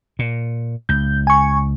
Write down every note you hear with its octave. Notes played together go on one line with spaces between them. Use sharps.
A#2
C#2 G6
G#5 C#6